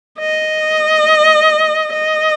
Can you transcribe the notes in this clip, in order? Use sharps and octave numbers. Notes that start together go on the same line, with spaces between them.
D#5
D#5